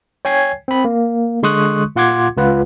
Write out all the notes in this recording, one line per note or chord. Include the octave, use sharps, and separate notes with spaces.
C#5 G5 G#5 G#6 C7
C4 B5
A#3
D3 G#3 C6 C#6 D#6 F#6
A#2 F4 F#5 C6 D6 G#6
C#2 F4 B4 F#5